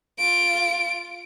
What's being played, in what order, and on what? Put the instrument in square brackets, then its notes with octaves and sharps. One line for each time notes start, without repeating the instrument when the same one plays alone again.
[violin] F4 D7